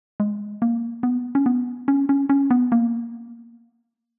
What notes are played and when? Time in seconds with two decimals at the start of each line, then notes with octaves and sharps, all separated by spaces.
0.20 G#3
0.62 A#3
1.03 B3
1.35 C#4
1.46 B3
1.88 C#4
2.09 C#4
2.29 C#4
2.51 B3
2.72 A#3